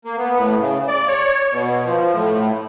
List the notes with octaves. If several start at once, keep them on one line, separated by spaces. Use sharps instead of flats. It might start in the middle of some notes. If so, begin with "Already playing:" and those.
A#3
B3
A2
C#3
D5
C#5
B2
F3
A2